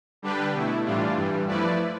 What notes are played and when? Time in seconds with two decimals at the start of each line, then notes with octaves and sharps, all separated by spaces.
0.22 D3 G3 D4 G4 B4
0.53 B2 A3 E4
0.85 A2 E3 G3 D4 F4
1.17 G2 E3 G3
1.47 F3 A3 E4 B4 D5